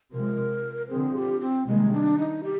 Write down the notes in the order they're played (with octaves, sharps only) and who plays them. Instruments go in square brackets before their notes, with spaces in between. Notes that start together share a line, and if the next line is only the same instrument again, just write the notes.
[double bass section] C3 F3 G#3 [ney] A#4
[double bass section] D3 F3 C4 [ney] G#4
[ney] G4
C4
[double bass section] C3 D#3 G3 A#3 [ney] G#3
[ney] D4
D#4
G4